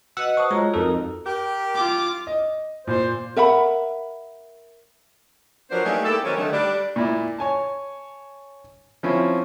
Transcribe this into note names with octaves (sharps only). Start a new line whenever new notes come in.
F#4 B4 D#5 F#5 E6
C5 A5 C#6 D#6
G#3 F4 F#4 C#5 A#5
F2 D#4 A4 A#4
G4 A#4
F4 D6
D#5
A#2 C5
A#4 E5 F#5 B5
F3 F#3 B3 D4 A#4 C5
A3 A#3 D4 D#4 G4 G#4
A#3 E4 G4 A4
D#3 F#3 C4 C#4
D3 D#3 A3
G3 D4
A#2 E4 D5
C#5 G#5 A5
F3 C4 C#4 E4